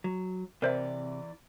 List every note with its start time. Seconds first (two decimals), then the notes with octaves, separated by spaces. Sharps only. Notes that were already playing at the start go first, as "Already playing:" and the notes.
0.04 F#3
0.62 C3 E3 A#4 C5 D5 E5